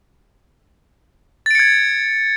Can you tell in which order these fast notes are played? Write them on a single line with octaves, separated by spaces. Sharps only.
A6 D7 C#7 G#6